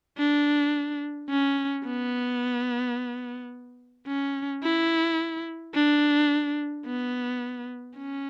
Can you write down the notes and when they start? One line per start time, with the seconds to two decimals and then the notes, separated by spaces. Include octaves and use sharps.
0.18 D4
1.30 C#4
1.85 B3
4.08 C#4
4.63 E4
5.75 D4
6.86 B3
7.97 C#4